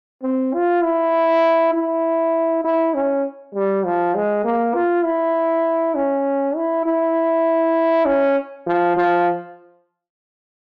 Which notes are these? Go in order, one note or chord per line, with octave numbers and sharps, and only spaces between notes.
C4
F4
E4
E4
E4
C#4
G3
F3
G#3
A#3
F4
E4
C#4
E4
E4
C#4
F3
F3